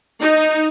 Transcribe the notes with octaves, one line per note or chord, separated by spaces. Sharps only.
D#4